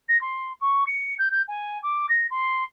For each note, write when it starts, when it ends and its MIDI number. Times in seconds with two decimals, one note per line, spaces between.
0.08 0.19 94
0.21 0.53 84
0.61 0.84 85
0.87 1.15 97
1.19 1.29 91
1.32 1.42 91
1.48 1.79 80
1.83 2.06 86
2.09 2.27 94
2.31 2.64 84